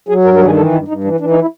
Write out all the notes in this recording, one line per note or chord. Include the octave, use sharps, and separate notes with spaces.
F#3 G#4
G2 A#4
A#4
D#3 G#4
E3 A4
G2 E4
G2 D#4
E3 D4
E3 D4
D#4
E4